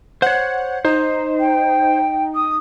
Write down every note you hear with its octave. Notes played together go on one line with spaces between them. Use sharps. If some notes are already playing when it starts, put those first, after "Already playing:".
C5 C#5 F#5
D#4 C5
G5
D#6